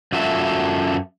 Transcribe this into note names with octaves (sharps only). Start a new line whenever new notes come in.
F#2 F4 F#4 A4 E5